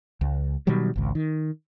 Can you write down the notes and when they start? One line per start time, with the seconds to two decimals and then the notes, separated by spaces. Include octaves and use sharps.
0.21 C#2
0.67 B2 D#3 F#3 G3
0.96 G#1 C#2
1.15 D#3